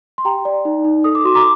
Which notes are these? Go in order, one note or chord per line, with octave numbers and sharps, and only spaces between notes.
C6
G4 G5 A#5
D5
D#4
D#4
A4 D#6
D6
F#4 C6
A#5 D6